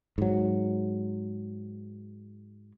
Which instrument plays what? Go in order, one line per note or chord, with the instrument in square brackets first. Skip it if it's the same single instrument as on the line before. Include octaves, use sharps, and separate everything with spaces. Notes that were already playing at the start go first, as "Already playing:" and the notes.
[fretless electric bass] G#2 F#3